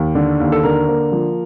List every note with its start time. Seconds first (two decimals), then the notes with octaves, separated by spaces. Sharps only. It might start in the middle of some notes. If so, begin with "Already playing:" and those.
Already playing: D#2
0.15 D3
0.40 D#2
0.52 A4
0.63 D3 A#4
0.88 A#3
1.12 F3